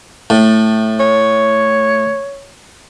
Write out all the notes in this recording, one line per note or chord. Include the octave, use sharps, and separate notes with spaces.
A2
C#5